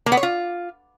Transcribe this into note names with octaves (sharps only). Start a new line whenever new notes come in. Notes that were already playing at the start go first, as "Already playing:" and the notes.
A#3
B3
C#5
F4